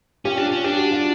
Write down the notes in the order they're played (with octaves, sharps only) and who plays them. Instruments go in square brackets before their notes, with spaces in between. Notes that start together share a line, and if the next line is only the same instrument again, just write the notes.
[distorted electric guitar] C#4 [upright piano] F4 G4
[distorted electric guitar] D4
C#4
[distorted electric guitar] D4 [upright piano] G4
[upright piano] F#4
F4